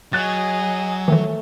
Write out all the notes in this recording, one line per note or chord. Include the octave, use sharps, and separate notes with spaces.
F#3 G#4 D#5 F#6 A6
D#3 E3 A3